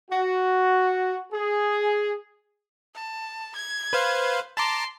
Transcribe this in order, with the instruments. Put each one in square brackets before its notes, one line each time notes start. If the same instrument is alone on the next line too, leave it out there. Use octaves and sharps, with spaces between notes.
[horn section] F#4
G#4
[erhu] A5
G#6
[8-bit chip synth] B4 C5 F5
[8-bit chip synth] A5 A#5 D6 [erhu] C6